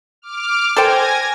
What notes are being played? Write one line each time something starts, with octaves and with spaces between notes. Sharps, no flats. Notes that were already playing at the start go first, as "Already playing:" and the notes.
D6 F6
A4 C5 G5 G#5 G#6 A#6